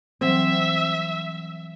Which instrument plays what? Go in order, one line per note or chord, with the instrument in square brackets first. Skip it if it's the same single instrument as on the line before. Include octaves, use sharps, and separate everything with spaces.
[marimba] E3 F#3 G3 [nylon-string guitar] C4 [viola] E5